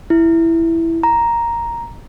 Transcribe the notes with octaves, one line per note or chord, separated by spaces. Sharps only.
E4
A#5